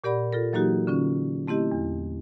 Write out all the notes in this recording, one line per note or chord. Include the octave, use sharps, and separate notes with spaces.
A#2 G4 A#4 D5 F#5 B5
F4 A4 A#4
E3 F#3 A#3 D#4 F#4 G4
D3 C#4 F4
A3 C4 E4 G4 D#5
E2